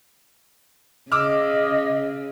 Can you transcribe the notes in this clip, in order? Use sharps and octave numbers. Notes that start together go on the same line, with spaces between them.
C#3 D#5 D6 E6 F6